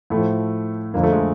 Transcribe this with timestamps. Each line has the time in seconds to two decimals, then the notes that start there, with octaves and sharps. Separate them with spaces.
0.10 A2 F3 A3
0.94 F2 D3 F3 A#3
1.03 A3
1.13 G#3